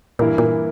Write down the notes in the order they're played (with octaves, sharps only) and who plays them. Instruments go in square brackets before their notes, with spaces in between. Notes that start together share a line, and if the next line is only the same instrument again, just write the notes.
[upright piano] G2 E3 A#3 E4 A#4 [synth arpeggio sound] A#2
[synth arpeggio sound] A#2